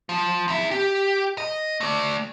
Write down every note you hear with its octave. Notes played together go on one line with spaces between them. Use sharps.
F3
E2 E5
G4
D#5
A3 D5